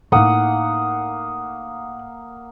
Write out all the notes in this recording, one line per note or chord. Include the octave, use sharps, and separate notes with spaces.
A2 A#3 D#4 F#5 D#6